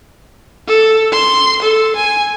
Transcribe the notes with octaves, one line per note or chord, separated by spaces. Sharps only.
A4
C6
A4
G#5